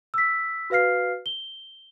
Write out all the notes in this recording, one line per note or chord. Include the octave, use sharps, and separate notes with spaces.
E6 B6
F#4 B4 F5 F6 C7
G7